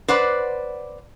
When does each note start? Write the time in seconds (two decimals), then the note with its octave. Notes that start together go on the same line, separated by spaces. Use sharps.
0.08 B4 C5 D5 F#5